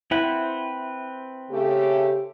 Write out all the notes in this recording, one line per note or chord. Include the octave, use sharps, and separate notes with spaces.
C4 E4 B4 F#5
C#3 A3 G4